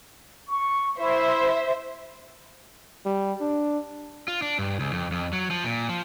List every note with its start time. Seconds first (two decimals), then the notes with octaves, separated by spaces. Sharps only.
0.48 C#6
0.99 E4 C5 E5
3.06 G3
3.41 D4
4.28 F4
4.42 D4
4.59 G2
4.80 C#2
4.93 F2
5.12 F2
5.33 F#3
5.50 F3
5.64 A#2
5.89 F3